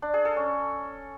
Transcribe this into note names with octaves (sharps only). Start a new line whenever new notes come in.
D4
G#4
A4
C#4